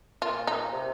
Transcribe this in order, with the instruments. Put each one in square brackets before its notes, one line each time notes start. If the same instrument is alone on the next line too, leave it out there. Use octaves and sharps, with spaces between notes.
[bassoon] A#2 [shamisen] F4
[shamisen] D#4
[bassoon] C3